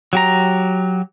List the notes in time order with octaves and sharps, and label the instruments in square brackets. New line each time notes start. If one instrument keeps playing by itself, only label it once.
[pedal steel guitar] F#3 G4 A#5